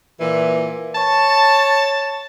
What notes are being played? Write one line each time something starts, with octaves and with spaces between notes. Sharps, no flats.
A#2 E3
C#5 A5